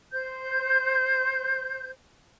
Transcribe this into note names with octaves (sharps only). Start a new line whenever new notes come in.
C5 G6